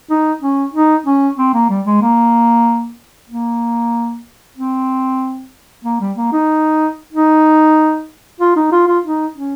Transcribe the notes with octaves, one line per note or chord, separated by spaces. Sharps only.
D#4
C#4
D#4
C#4
C4
A#3
G3
G#3
A#3
A#3
C4
A#3
G3
A#3
D#4
D#4
F4
D#4
F4
F4
D#4
C#4